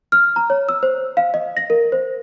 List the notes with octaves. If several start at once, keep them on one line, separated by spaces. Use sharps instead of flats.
F6
A#5
C#5
E6
C5
F5
D#5
A#6
A#4
C5